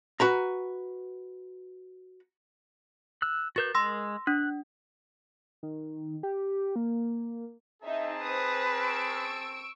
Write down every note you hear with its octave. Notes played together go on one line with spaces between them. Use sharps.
F#4 B4 A#5
E6 F#6
F#4 A#4 B4 G6 A6
G#3 C6 E6 A#6
D4 F#6
D#3
G4
A#3
C4 D#4 G#4 E5 A5
B4 C5 D#6
C#6 E6 D7